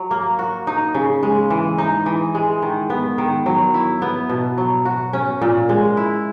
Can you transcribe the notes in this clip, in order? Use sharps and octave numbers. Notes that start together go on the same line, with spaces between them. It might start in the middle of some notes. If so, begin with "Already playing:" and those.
Already playing: F#3
A#3
F#4
D#4
C#3
G#3
E3
D#4
E3
G#3
D#3
B3
D#3
F#3
E4
B3
B2
F#3
F#4
C#4
A#2
G#3
E4